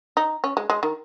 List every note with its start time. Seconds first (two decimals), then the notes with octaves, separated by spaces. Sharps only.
0.17 D#4
0.44 C#4
0.57 G#3
0.70 G#3
0.83 D#3